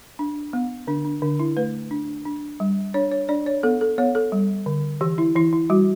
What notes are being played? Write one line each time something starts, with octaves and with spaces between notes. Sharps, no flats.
D4
B3
D3 D4
D4
D3 D4
E4
A3 B4
D4
D4
G3
D4 C#5
C#5
D4 D5
C#5
B3 A4
A4
B3 C#5
A4
G3
D3
E3 G4
E4
E3 E4
E4
G3 F#4